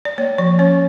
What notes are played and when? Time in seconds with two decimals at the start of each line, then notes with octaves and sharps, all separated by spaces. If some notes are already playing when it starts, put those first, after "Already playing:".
0.05 D5
0.18 A#3 C#5
0.38 F3 D5
0.59 C#4 C#5